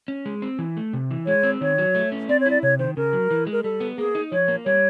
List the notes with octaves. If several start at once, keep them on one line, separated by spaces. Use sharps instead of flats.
C#4
G#3
C4
E3
A3
C3
E3
G#3 C#5
C4
D#3 C#5
F#3
A3
C#4
C4 D5
C#5
E4 D5
C3 C#5
D#3 C5
C#3 A#4
F#3
E3
G#3
A#4
G3 A4
B3
A#3 G#4
D#4
F3 C#5
A#3
G3 C#5